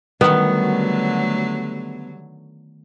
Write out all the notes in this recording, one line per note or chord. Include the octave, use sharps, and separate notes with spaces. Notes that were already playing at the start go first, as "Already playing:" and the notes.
D3 D#3 F#3 G3 A3 B3 F#4